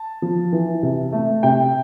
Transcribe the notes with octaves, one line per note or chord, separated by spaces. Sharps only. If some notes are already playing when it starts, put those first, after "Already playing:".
Already playing: A5
F3
E3
C3
A3
C3 G5